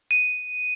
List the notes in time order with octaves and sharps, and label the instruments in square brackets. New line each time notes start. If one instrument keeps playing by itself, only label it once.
[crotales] D#7